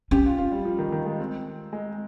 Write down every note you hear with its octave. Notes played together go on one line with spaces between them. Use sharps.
C#4 G4
F4
F4
G3
F3
D#3
D#3
G#3
C4
G#3